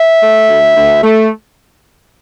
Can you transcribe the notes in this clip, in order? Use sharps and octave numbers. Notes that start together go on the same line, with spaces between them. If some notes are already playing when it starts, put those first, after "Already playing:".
Already playing: E5
A3
D2
D2
A3